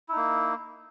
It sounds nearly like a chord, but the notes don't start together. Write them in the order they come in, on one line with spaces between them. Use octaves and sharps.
E4 D#4 A#3